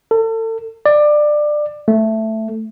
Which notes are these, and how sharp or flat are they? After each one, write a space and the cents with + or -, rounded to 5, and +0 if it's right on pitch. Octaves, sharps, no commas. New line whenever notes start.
A4 +35
D5 +20
A3 +5